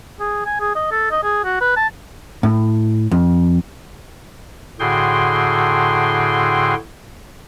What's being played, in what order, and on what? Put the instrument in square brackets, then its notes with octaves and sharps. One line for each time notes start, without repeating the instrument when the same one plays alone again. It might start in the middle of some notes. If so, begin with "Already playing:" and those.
[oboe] G#4
G#5
G#4
D#5
A4
D#5
G#4
F#4
B4
A5
[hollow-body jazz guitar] A2
F2
[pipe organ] A2 D3 F#4 G#4 G5 C6